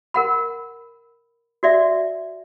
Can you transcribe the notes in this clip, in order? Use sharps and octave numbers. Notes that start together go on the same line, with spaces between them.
A#4 F#5 B5
F#4 D5 E5